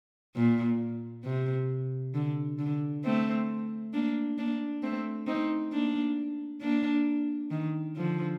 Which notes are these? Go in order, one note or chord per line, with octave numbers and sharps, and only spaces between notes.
A#2
C3
D3
D3
A3 C4
A#3 D4
A#3 D4
A3 C4
C4 D#4
A#3 D4
A#3 D4
D#3
D3 F3